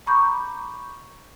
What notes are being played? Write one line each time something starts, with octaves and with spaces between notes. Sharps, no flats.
A#5 B5 C#6 D6 G6